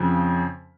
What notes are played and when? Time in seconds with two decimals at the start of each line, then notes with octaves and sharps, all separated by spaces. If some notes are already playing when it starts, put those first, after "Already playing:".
Already playing: F2 C#3 F3